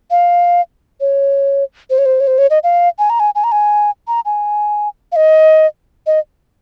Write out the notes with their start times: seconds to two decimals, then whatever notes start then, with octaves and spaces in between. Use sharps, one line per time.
0.11 F5
1.01 C#5
1.90 C5
1.98 C#5
2.06 C5
2.20 C#5
2.27 C5
2.38 C#5
2.50 D#5
2.63 F5
2.99 G#5
3.10 A#5
3.20 G#5
3.35 G#5
3.44 A#5
3.52 G#5
4.08 A#5
4.25 G#5
5.12 F5
5.16 D#5
6.07 D#5